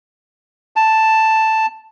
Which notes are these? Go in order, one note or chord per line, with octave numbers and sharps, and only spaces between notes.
A5